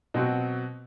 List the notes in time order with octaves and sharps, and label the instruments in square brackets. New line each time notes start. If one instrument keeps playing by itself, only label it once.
[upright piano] B2 F#3 C4 F#4